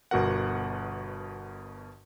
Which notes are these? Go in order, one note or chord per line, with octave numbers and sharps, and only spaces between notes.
G1 B2 F#4 A#4 F#5